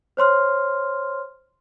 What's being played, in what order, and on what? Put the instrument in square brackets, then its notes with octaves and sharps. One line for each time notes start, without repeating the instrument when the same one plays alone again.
[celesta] C5 C#5 C6 F6